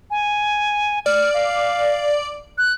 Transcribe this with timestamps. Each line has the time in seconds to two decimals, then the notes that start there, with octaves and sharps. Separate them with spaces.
0.11 G#5
1.06 D5 F6
1.34 F5
2.58 F#6